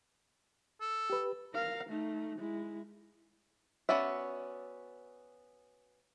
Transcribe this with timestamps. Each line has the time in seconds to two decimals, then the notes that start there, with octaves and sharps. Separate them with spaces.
0.81 A4
1.10 G4 B4
1.54 A#4 F5
1.89 A3 D#4
2.38 G#3 E4
3.89 B3 C#4 F#4 D5 E5